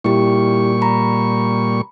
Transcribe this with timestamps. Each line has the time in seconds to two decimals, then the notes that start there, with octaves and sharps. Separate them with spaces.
0.04 A#2 G3 E4 G4 C#6
0.82 A#5 B5